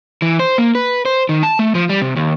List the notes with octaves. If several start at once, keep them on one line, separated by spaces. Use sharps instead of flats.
E3
C5
A#3
B4
C5
D#3
A5
A3
F3
G3
C3
D#2